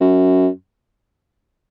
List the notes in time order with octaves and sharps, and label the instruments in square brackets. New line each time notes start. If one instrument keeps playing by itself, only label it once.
[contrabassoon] F#2